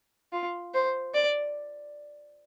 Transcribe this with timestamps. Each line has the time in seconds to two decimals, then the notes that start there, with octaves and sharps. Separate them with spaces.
0.33 F4
0.74 C5
1.14 D5